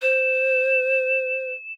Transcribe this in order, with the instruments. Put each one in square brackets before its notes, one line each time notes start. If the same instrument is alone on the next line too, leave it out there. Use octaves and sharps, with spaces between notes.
[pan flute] C5 [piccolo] E7